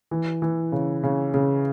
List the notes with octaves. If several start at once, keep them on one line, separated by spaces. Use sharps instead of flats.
E3
E3
C#3
C#3
C#3